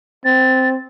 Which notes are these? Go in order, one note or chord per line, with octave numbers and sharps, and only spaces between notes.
C4 A6